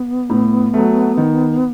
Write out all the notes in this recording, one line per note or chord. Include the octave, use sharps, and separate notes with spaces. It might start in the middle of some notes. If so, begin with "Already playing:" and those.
Already playing: B3
A2
F#3 A3
D#3